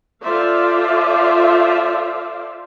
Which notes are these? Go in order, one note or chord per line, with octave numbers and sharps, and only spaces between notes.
F4 A4 C5 D5 E5 F5